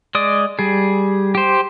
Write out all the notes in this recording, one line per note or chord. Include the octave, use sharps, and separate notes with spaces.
G#3 D5 D#6
G3 G#4
G4 C5